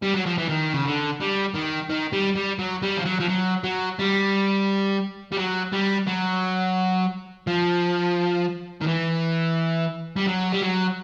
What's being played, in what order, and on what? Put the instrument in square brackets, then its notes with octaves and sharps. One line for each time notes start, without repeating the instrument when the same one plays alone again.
[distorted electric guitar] G3
F#3
F3
E3
D#3
C#3
D3
G3
D#3
D#3
G3
G3
F#3
G3
F3
F#3
F3
F#3
F#3
G3
G3
F#3
G3
F#3
F3
D#3
E3
G3
F#3
G3
F#3